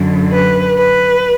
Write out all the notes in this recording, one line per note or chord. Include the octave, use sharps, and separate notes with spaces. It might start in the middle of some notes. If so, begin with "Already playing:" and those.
Already playing: F#2 D3
B4
B4